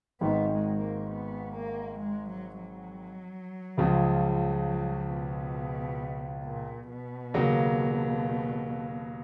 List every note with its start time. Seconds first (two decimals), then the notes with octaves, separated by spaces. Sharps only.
0.21 G#1 G#2 D#3 B3
0.51 G#3
0.81 A#3
1.10 B3
1.55 A#3
1.99 G#3
2.29 F#3
2.59 F#3
3.77 C#2 C#3 F3
4.67 F#3
5.12 B2
6.45 A#2
6.90 B2
7.34 D#2 C#3 F#3 A#3